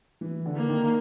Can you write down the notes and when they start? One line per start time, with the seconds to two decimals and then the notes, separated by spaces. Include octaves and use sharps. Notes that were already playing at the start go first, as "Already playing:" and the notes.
0.21 E3
0.45 D3
0.57 A#3
0.68 D#3